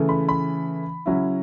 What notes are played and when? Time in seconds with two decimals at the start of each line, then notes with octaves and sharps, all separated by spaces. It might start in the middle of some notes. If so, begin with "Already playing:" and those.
Already playing: C#3 E3 A3
0.09 B5
0.29 B5
1.06 C#3 F#3 C#4 E4